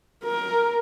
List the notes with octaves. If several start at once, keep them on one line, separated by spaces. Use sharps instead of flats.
A#4